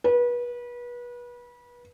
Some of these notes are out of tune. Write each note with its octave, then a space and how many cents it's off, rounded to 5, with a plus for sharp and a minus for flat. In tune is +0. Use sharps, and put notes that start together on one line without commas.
B4 -30